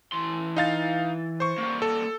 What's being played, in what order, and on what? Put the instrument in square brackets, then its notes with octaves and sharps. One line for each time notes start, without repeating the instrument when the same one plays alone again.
[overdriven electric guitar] E3 C6
[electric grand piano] D#4 F5 A6
C5 C#6
[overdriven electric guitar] G3 A#3
[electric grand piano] A4